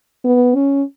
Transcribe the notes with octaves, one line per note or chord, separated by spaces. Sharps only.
B3
C#4